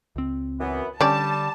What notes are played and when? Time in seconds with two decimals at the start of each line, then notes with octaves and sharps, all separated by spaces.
0.16 C#2 C4
0.61 F#2 E3 B3
1.01 D3 G3 C#4 G4 D5 A5